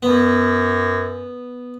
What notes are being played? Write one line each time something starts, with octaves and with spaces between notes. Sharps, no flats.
F#2 B3